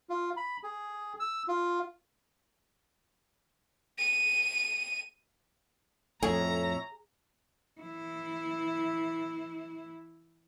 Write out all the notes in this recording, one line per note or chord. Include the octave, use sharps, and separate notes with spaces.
F4
B5
G#4
E6
F4
D#7
F2 A2 G#4 C#5 E5 A#5
E3 E4